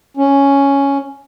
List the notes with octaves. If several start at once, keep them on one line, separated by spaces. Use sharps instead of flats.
C#4